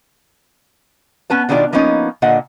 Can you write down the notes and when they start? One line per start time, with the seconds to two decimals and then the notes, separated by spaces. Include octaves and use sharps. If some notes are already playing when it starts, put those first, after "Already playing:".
1.30 B3 C#4 B4 A5
1.49 B2 D#3 D4 F4 A#4 D5
1.73 F3 A#3 B3 C#4 D#4
2.22 A#2 D3 D#5 F#5